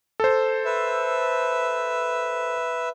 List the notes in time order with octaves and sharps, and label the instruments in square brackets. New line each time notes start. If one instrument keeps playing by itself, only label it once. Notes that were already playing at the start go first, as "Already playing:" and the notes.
[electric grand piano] A4 C5
[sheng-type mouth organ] B4 E5